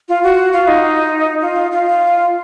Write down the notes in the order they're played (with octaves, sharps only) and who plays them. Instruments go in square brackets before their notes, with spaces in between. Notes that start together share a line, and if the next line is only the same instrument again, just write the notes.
[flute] F4
F#4
F4
D#4
F4
F4